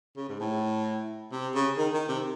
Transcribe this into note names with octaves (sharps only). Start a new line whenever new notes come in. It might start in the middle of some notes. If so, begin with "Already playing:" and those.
C#3
G#2
A2
C3
C#3
D#3
D#3
C3